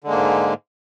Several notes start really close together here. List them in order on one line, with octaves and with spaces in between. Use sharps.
D3 G#3 A#3 G#2